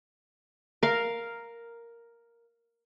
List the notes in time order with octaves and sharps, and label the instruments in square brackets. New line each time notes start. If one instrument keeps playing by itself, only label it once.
[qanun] A#4 F5